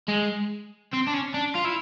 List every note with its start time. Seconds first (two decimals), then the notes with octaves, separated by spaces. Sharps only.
0.08 G#3
0.93 C4
1.07 D4
1.13 C#4
1.34 D4
1.55 F4
1.65 E4